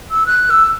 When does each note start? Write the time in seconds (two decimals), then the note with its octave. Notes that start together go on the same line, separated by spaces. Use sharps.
0.11 E6
0.27 F#6
0.50 E6